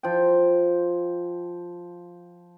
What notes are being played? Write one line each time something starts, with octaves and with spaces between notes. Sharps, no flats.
F3 G5